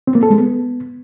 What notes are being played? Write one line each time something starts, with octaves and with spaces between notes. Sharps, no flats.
C4
A#3
A4
G#3
B3